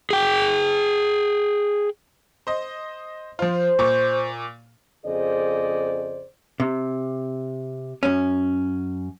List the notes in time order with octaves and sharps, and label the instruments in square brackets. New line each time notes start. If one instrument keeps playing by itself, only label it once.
[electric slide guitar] G#4 G5
[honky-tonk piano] C5 D#5
[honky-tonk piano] F3 F4 [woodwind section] C5
[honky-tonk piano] A#2 C#6 D6
[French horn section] F2 C#3 G#4 C5 D5 D#5
[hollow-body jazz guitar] C3
F#2 C#4